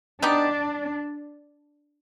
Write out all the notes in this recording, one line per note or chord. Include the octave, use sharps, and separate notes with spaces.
B3 D4 D#4 G4